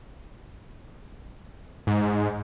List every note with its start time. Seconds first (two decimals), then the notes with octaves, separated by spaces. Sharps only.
1.87 G#2